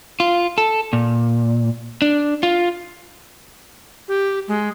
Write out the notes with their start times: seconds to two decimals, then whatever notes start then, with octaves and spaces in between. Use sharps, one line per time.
0.20 F4
0.58 A4
0.93 A#2
2.02 D4
2.43 F4
4.08 G4
4.48 G#3